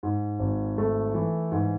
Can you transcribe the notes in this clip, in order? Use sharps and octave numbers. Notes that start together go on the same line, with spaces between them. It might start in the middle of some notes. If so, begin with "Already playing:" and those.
G#2
G#1
A3
E3
G#2